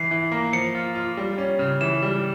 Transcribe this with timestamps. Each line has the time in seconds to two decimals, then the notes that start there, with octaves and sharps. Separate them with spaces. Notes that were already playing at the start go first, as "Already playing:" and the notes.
Already playing: E3 C7
0.11 E3
0.32 A#3
0.53 F3 C#7
0.75 F4
0.95 F4
1.17 G3
1.38 C#4
1.59 C#3
1.81 E3 E7
2.03 G3